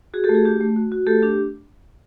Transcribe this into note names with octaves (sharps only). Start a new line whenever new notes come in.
F#4 G#4
G4 A4
A3
F#4 G#4
D4 G4
A3
F#4
F#4
A3 G4 A4
D4 G4